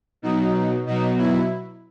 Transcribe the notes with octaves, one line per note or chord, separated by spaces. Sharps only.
B2 F#3 D#4
B2 F#3 D#4
E4